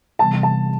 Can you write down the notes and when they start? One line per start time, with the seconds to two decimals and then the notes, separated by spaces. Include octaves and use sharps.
0.19 C3 E3 G3 B3 A5
0.43 A5